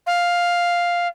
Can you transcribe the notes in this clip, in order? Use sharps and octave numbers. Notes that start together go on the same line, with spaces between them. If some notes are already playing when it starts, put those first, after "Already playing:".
F5